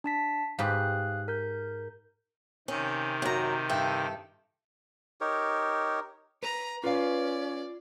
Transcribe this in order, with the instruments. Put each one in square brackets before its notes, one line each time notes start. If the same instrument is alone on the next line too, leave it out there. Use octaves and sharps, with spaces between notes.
[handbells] D4 A5 B6
[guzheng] G#2 G4 B4 [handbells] F5 D#6 F#6
[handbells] A#4 G6
[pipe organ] C3 D#3 [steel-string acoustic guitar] C#4
[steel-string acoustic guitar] F#2 A#5
G2 E4 A4
[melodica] D#4 G4 A#4 C#5
[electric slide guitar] B4 [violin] A#5
[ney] C#4 [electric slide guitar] F4 [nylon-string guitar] B4 F5 [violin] D5